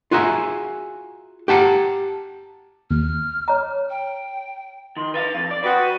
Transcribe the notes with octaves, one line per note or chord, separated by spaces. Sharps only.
F4 F#4 G#4 E5 A#5
G4 F#5 A5 A#5
D#2 F6
C#5 A#5
G5
D#3 C6
B4 E5 F5 A6
F2
D5
C4 F#4 B4 D#6
D#7